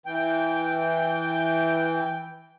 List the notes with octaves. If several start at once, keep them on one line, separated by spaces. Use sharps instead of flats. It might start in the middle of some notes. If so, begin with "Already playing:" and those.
E3 G5